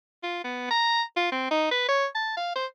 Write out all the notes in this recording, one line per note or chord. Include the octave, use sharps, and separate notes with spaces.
F4
B3
A#5
F4
C4
D#4
B4
C#5
A5
F5
C5